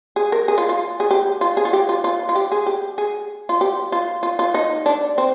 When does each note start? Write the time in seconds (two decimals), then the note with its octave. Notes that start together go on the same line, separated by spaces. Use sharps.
0.16 G#4
0.32 A#4
0.48 G#4
0.58 F4
0.69 F4
1.00 G#4
1.11 G4
1.41 F4
1.57 G#4
1.65 F4
1.73 G4
1.89 F4
2.04 F4
2.29 F4
2.36 G4
2.52 G#4
2.66 G4
2.98 G#4
3.49 F4
3.61 G4
3.92 F4
4.23 F4
4.39 F4
4.54 D#4
4.86 D4
5.18 C4